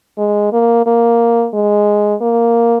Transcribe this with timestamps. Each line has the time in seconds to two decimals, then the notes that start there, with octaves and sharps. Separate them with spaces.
0.18 G#3
0.52 A#3
0.86 A#3
1.54 G#3
2.21 A#3